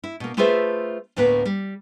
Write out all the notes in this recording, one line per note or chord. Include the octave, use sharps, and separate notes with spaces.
E4
B2 A#3
A3 F4 G#4 B4 C5 E5
D2 A2 A#3 B3 B4
G3